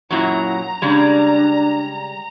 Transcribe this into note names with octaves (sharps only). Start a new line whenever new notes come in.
F#2 A#2 F#3 E4 A#5
C#3 G3 G#3 D4